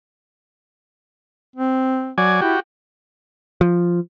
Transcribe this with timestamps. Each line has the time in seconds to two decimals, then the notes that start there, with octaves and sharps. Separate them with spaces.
1.56 C4
2.18 F#3 D5 G#5
2.41 E4 F#4 G4
3.61 F3